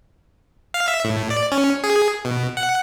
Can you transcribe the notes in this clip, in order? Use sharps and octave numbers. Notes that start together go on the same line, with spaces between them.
F5
E5
A2
D5
C#4
G#4
B2
F#5